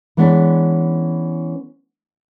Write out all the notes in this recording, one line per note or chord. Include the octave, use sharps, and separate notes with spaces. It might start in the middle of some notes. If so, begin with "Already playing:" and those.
E3 G#3 B3 C#4 D4